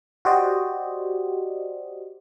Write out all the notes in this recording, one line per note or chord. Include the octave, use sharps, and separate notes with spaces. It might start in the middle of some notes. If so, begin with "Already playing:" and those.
F#4 G4 C5 D5 D#5